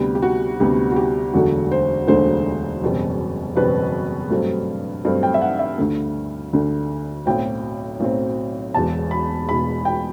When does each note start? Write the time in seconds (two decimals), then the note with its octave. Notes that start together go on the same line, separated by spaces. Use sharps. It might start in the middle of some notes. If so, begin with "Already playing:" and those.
Already playing: D2 C3 G3 B3 G4
0.15 G4
0.22 F#4
0.60 D2 C3 G3 B3 G4
0.92 F#4
0.96 G4
1.34 E1 D2 D3 F#3 A3 F#4
1.72 C5
2.07 E1 D2 D3 F#3 A3 C5
2.82 F#1 E2 B2 G3 C4
3.56 F#1 E2 B2 G3 C4 B4
4.30 G2 F#3 A3 C4
5.05 G2 F#3 A3 C4
5.23 G5
5.34 E5
5.42 F#5
5.59 E5
5.78 D2 D3 A3
6.53 D2 D3 A3
7.26 B1 A2 F#3 C4 G5
8.00 B1 A2 F#3 C4
8.74 E1 E2 B2 A5
9.11 B5
9.49 E1 E2 B2 B5
9.85 G5